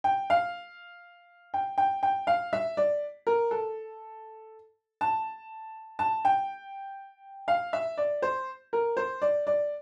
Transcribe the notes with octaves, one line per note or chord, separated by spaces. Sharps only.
G5
F5
G5
G5
G5
F5
E5
D5
A#4
A4
A5
A5
G5
F5
E5
D5
C5
A#4
C5
D5
D5